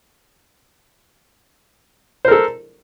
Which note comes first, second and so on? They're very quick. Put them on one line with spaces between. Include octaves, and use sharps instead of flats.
C5 A#4 A4